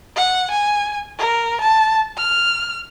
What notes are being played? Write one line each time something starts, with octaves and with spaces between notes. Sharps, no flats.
F#5
G#5
A#4
A5
F6